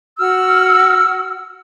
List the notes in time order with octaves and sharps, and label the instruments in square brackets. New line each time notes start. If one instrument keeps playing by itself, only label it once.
[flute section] F#4 E6 F6